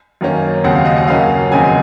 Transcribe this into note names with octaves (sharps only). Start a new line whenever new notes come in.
F#2 D#3 A#3 C#4
D#2 C#3 F#3 C4 F#5
F5
D#5
D#5
F#2 C#3 F#3 A#3 C#4 F5
F1 D#2 C#3 F#3 C4 G#5